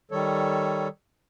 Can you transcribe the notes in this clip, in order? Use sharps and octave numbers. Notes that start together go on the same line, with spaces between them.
D#3 G3 A4 C#5